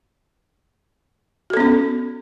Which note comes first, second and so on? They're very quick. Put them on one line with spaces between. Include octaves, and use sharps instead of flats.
F#4 A4 B3 C#4